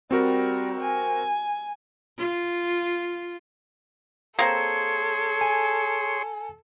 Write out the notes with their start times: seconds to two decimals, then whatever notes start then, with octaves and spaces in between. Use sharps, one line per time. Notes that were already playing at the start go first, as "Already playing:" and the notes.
0.11 G3 C4 F#4 A#4
0.81 G#5
2.18 F4
4.39 A#3 C4 G#4 A4 C#5 C6
5.41 G#5